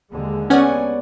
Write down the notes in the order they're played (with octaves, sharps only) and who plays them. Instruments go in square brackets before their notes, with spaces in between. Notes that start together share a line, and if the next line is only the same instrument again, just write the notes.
[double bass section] D#2 D3 G#3
[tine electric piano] B3 C#5 D5 [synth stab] C#4 F#5 G#5